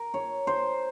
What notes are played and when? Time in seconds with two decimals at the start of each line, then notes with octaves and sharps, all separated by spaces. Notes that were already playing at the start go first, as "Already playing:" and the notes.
Already playing: A#4
0.14 C#5
0.47 C5